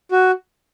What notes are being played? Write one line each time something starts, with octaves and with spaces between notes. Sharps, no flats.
F#4